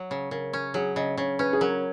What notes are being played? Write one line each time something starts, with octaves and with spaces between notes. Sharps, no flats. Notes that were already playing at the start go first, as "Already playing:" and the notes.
Already playing: F#3
C#3
C#3 A#4
C#4
F#3 G#4
C#3 D#5
C#3 C#5
C#4 B4
G#4
F#3 A#4